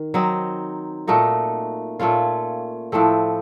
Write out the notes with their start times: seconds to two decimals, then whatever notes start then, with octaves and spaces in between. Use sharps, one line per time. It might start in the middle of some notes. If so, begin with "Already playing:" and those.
Already playing: D#3
0.14 F#3 C4 D#4
1.07 A#2 A3 D#4 F#4
1.99 A#2 A3 C#4 F4
2.92 A2 F3 A3 C4